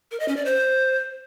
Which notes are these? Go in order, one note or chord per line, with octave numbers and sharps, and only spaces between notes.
A#4
D#5
C#4
D5
C5